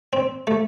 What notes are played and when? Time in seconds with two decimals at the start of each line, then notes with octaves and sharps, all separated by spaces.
0.13 C4
0.47 A3